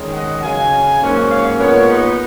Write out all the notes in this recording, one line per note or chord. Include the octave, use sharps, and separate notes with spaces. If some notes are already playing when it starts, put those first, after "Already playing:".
Already playing: D#3 G#3 C#4
D#5 F#5
C#3 F#3 C#4 F5 G#5
G#2 F#3 A#3 C#4
C#5 F5
A#2 G#3 B3 A#4 C#5
D#4